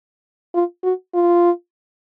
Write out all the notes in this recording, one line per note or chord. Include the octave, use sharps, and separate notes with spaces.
F4
F#4
F4